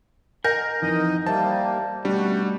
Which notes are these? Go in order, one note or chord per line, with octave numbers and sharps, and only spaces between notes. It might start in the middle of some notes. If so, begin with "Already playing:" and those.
A#4 D#5 F#5 G#5 G6 A#6
F2 E3 D#4 D#5
G3 A#3 C5 D5 E5 A5
B2 G3 A3 C#4 D4 F#4